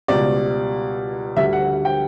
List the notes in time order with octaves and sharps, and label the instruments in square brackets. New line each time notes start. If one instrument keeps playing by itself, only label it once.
[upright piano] C#2 B2 G3 D5
D2 D3 G3 E5
F#5
G5